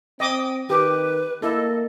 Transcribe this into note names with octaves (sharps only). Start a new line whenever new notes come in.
C4 D#5 G5 D6 D#6
D#3 G4 B4
A#3 E4 A4 D#5